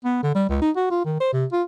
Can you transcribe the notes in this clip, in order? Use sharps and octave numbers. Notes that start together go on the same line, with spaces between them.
B3
D3
G3
C#2
D#4
F#4
F4
D#3
C5
C3
F4